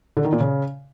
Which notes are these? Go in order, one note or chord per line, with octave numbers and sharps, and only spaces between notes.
D3
D#3
A#2
C#3